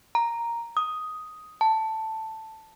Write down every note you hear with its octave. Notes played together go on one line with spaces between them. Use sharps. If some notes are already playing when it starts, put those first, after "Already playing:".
A#5
D#6
A5